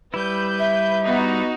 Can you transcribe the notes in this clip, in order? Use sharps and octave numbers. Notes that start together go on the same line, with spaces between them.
G3 E4 B4 G6
E5
B3 D#4 F#4